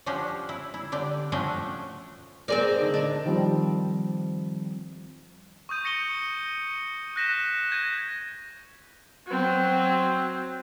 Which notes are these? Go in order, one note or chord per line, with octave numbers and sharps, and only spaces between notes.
F3 C#4 D4 F#4 G4
E4
E4
D3 G4 D5
F3 A3 C#4 D4 F#4 G5
C4 G#4 A#4 C5 D5
D3 D#4
D4
D#3 F3 G3 C4
C#6 D#6 G6 D#7
A#6 C#7 D#7 G7
F#6 G6 A#6 B6 D#7 E7
G6 G#6 A#6 D#7
F#3 C4